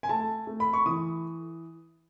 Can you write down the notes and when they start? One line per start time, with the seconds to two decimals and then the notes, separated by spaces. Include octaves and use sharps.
0.03 G#5
0.09 A3 A5
0.47 A3
0.60 B5
0.73 C#6
0.86 E3 D#6